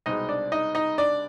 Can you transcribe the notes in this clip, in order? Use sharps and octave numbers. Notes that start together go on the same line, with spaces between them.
C2 B2 G#3 D#4 D#5
D4 D5
D#4 D#5
D#4 D#5
D4 D5